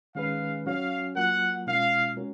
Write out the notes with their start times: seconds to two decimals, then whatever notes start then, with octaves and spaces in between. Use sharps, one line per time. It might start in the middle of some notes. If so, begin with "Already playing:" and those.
0.15 D#3 G#3 C#4 G#4 B4 F5
0.65 F#3 C#4 F#4 C#5 F5
1.15 F#3 A#3 F4 A#4 F#5
1.66 B2 G#3 C#4 F4 F5
2.16 G#3 C#4 F#4 A#4 C#5